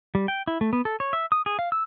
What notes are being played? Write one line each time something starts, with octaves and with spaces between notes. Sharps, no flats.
G3
G5
E4
A3
B3
A4
C#5
E5
D#6
G#4
F5
E6